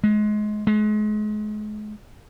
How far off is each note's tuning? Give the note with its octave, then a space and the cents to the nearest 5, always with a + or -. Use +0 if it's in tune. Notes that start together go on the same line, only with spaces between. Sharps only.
G#3 +25
G#3 +35